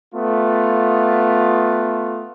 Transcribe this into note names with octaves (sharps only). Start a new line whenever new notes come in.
A3 B3 F4